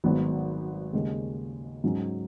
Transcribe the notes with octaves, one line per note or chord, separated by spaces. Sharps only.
G#1 G#2 F#3 B3
D#2 C#3 G#3
G#2 F#3 C#4